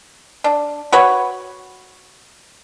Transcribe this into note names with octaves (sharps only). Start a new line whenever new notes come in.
D4
F#4 B4 C#5